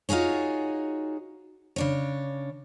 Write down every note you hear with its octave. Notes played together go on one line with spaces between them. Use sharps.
D#4 F4 F#4 G#4 C#5
C#3 D4 C#5